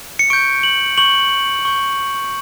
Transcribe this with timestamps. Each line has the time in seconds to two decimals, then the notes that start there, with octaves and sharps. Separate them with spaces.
0.19 C#7
0.30 C#6 G6 D7
0.63 F#7
0.98 C#6 G6 F#7
1.65 C#6 G6